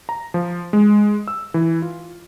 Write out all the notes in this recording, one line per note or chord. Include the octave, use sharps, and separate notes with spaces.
A#5
F3
G#3
E6
E3
F4